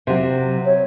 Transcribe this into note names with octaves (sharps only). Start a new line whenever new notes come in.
C3 F#3
C#5